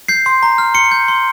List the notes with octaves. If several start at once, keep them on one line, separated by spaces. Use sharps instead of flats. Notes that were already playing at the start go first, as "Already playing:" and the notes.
G6 C7
C6
A#5
F6
C6 C#7
G6
C6